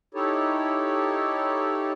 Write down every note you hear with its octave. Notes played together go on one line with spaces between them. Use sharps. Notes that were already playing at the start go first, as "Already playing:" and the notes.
D#4 E4 G4 A4 C#5